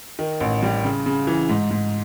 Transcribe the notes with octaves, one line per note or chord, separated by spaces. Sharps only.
D#3
A1
G3
C#3
C#3
E3
G#2
G#2